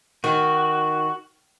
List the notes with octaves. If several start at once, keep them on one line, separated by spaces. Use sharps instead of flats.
D#3 F#4